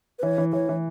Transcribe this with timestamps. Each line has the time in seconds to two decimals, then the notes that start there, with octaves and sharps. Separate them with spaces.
0.19 B4
0.23 E3 C#5
0.38 E3
0.53 E3 C#5
0.69 E3